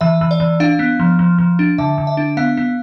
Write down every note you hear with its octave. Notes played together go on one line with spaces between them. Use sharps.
E3 E5
E3
D5
E3
D4 F5
B3
F3
F3
F3
D4
D3 E5
D3
E5
D4
B3 F5
B3